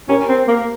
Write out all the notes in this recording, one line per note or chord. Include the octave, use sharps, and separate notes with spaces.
C#4 G4 A#4
C4
A#3